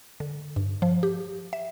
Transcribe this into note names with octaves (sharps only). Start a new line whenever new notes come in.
D3
G2
F3
G4
E5